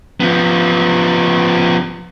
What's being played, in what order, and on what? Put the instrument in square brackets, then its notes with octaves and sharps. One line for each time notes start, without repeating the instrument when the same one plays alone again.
[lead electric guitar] F3 B3